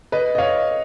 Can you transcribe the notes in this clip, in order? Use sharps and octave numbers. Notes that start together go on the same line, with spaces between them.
B4 D#5
D#5
C#5 F5